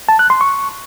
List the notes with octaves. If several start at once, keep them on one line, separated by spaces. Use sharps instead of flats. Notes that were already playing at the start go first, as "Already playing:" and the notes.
A5
F#6
C6
C#6